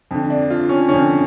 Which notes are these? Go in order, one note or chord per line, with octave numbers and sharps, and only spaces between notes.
F2 D3
D4
F4
C#4
F2 D3 C#4